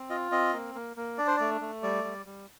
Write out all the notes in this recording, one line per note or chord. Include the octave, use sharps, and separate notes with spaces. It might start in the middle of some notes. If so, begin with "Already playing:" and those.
Already playing: C4
F4 D#5
C4 D#5
A#3
A#3
A#3
D4 D5
C5
A3 D5
A3
G3 D5
G3
G3